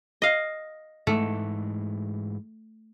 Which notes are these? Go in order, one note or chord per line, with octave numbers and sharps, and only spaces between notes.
D#5 F5
G#2 E3 A3